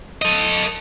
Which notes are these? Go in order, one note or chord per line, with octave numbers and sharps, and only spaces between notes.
A4 D#5